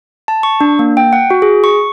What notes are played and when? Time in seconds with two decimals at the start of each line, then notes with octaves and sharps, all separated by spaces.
0.28 A5
0.43 C#6
0.61 D4
0.79 A#3
0.97 G5
1.13 F#5
1.31 F#4
1.42 G#4
1.64 C#6